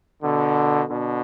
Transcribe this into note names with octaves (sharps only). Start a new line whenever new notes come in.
B2 D3
B2 D3